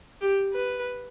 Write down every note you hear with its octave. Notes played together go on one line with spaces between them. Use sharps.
G4
B4